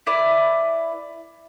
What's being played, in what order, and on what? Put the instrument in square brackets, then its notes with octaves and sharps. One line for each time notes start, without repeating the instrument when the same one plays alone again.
[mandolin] E4 B4 D5